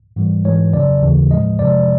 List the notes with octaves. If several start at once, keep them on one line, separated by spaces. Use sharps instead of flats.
G#2 E3 G3
G#2 E3 G#3 C#5
F2 C#3 F#3 D5
D#2 C#3 E3
A2 F3 G#3 D#5
F2 C3 F3 G#3 D5